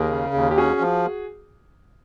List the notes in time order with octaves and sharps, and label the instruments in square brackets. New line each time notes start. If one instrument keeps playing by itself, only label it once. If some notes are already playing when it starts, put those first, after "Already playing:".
Already playing: [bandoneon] D#2 [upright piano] G#4 A#4
[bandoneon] C#3
D#2
[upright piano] G4
[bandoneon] C#4 [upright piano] F#4 G#4
[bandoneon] F3